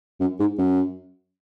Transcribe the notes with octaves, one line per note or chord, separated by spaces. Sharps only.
F#2
G#2
F#2